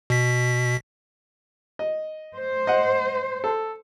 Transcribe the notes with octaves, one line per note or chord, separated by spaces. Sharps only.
B2 B6
D#5
C5
D#5 F#5
A4